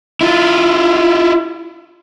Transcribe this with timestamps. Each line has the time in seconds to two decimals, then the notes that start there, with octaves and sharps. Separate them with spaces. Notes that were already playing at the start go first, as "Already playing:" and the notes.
0.21 E4 F4